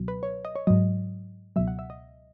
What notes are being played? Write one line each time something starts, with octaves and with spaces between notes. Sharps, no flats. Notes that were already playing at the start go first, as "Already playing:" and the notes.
Already playing: C#2 B2 F#3
B4
C#5
D#5
C#5
G#2 F#3 D#5
C#2 B2 F#3 E5
F#5
E5
D#5